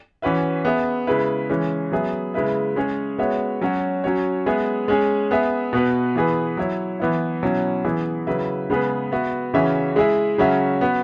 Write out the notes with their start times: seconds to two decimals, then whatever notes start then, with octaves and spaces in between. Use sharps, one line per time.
0.22 E3 C#4 F#4 B4 E5
0.65 B3 G#4 E5
1.07 C#3 G#3 E4 B4
1.50 E3 G#3 C#4
1.92 F#3 B3 G#4 E5
2.34 C#3 G#3 E4 B4 E5
2.76 G#3 C#4 G#4 C#5
3.18 G#3 B3 F#4 C#5 E5
3.61 F#3 C#4 F#4
4.04 F#3 C#4 F#4 C#5
4.46 G#3 B3 G#4 E5
4.88 G#3 C#4 G#4
5.31 B3 G#4 E5
5.73 B2 B3 F#4 B4
6.16 E3 B3 E4 G#4 B4
6.57 F#3 E4 C#5
7.00 E3 B3 E4
7.43 B2 F#3 C#4 E4
7.85 E3 B3 E4 G#4
8.27 C#3 F#3 E4 B4 E5
8.70 C#3 G#3 B3 G#4 B4
9.12 B3 F#4 B4 E5
9.54 C#3 E3 C#4 F#4 E5
9.96 G#3 E4 G#4 E5
10.38 C#3 F#3 C#4 F#4 E5
10.81 B3 F#4 B4